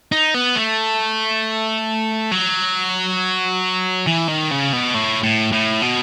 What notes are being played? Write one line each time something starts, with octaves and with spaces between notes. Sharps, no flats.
D#4
B3
A3
F#3
E3
D#3
C#3
B2
A2
A2
A2
B2